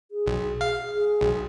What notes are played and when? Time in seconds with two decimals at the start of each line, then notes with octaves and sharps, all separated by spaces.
0.11 G#4
0.26 B1
0.61 F5
0.94 G#4
1.21 B1